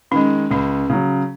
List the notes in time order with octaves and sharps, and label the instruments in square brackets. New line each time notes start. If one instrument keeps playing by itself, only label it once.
[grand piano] D#3 G#3 [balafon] C#4
[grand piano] C#2 [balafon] C#4
[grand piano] C#3 F#3